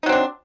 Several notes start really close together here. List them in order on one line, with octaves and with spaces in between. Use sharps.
D#4 F#3 C4 D4